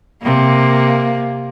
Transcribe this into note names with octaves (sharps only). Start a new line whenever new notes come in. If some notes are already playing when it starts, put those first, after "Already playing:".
C3 A#3